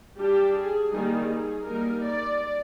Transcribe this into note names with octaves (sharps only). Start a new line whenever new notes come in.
G3 D4 G4
G#4
D#3 G3 A#3 D#4 G#4
G#4
G3 A#3 D#4 A#4
D5